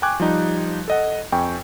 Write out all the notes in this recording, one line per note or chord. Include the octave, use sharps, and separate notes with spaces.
G5 G#5 C#6 D6 F#6 G#6
F3 G3 D#4 G4
A4 D#5 F#5
F2 G5 G#5 C#6